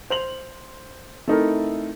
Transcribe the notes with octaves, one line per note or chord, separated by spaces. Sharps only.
C5 F7 F#7
A3 C4 D#4 E4 A4 A#4